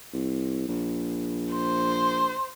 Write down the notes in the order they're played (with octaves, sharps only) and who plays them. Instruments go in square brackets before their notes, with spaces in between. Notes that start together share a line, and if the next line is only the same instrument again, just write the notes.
[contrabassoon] C2
A#1
[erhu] C5